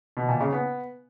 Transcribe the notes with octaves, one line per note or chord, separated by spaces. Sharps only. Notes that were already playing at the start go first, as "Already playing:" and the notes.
B2
A#2
C#3
B3